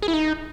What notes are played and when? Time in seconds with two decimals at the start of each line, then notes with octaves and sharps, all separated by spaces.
0.02 G#4
0.08 E4
0.14 D#4